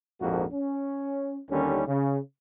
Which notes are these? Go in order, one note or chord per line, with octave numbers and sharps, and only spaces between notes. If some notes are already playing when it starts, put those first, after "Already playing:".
A#1 F2 G#2 F3 A#3 F#4
C#4
D#2 D3 D#3 G3 C#4
C#3